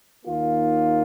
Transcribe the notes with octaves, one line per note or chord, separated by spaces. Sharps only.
D#2 D#3 A#3 F4